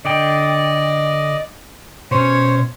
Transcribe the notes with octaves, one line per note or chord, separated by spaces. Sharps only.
D3 D5 D#5 G5
B2 C#4 C5 C#5